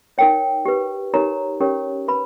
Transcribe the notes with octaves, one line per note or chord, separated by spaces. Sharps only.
D#4 A#4 C#5 G5
G4 B4
D#4 G4 A#4 C#5 A#5
C#4 G4 A#4 C#5
B4 B5